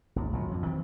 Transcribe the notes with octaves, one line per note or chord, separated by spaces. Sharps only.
G#1 D#2
G#1 C#2 A#2 F#3
F2
D#3 E3 C4